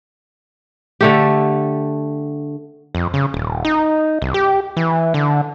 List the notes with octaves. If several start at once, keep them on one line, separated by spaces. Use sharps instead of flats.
D3 A3 G4
F2
C#3
D#1
D#4
C2
G4
E3
D3